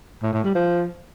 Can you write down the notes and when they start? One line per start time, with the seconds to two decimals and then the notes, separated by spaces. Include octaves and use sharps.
0.23 A2
0.33 A2
0.44 G3
0.55 F3